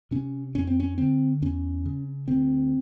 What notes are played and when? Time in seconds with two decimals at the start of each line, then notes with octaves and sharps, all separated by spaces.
0.11 C3 C#4
0.55 F2 C#4
0.67 C4
0.80 C#4
0.98 D3 C4
1.42 E2 C#4
1.86 C#3
2.28 D2 C4